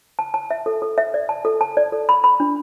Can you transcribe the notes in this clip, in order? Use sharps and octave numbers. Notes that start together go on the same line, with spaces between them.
A5
A5
E5
A4
A4
E5
D5
A5
A4
A5
D5
A4
B5
B5
D4